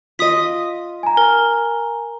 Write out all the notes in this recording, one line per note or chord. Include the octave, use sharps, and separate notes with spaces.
F4 D#5 D#6 B6
G#5 A#5
A#4